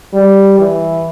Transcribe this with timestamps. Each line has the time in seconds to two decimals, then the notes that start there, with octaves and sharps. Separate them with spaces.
0.14 G3
0.59 E3